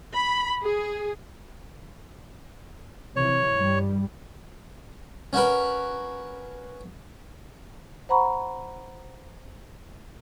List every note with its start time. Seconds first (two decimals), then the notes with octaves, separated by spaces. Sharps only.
0.13 B5
0.63 G#4
3.16 C3 E3 C#5
3.55 G2 G3
5.33 C#4 F#4 A#4 B4
8.09 C5 F#5 A#5 B5 C#6